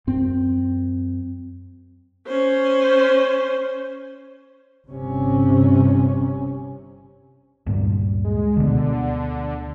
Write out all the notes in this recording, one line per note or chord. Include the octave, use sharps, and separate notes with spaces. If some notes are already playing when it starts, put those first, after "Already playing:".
F#2 C4
C#4 C5
G1 C3 C#4
D2 G2 A#2
G#3
D2 B2 D3